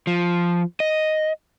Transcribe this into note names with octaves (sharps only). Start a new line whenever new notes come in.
F3
D#5